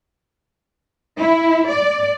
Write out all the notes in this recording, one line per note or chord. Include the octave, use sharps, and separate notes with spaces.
E4
D5